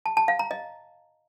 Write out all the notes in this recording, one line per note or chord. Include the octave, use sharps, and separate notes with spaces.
A5
A5
F5
A#5
D#5